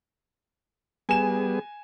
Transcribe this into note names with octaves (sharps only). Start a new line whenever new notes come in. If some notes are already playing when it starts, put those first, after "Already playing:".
G3 B3 G#4 G#5 E7